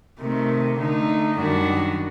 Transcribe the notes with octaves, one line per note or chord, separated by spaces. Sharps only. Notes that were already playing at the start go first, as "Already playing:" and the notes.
C3 D#3 A3
D3 A3 D#4
F#2 D#3 G3 D4 F#4